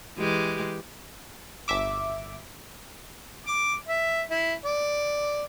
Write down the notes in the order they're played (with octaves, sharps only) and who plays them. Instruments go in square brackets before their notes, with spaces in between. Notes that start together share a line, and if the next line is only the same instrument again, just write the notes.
[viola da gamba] E3 G#3 G4
[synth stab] G1 E5 D6
[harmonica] D6
E5
E4
D5